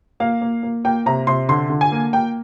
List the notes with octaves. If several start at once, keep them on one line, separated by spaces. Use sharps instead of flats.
A#3 F5
A#3
A#3
A#3 G5
C3 A#5
C3 C6
D3 C6
D3
G#5
A#3
A#3 G5